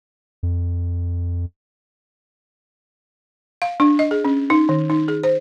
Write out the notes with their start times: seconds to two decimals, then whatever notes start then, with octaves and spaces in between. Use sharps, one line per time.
0.43 F2
3.62 F5
3.80 D4
3.99 D#5
4.11 G#4
4.25 C#4
4.50 D#4
4.69 D#3
4.90 D#4
5.08 G#4
5.23 C5